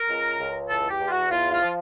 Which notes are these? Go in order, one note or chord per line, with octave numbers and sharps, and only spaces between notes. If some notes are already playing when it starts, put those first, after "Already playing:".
Already playing: A#4
C#2
C#2
E2 A4
G4
E2
F4
F#4
E2 F4
F4
F3